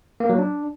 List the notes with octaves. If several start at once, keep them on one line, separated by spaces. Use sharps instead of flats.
A#3
F#3
D4